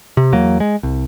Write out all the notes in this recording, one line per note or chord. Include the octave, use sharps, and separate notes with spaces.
C3
E2 F#3 A#3
G#3
C2